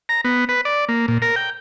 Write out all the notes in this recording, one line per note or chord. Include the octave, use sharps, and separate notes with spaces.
A#5
B3
B4
D5
A#3
A#2
A#4
G5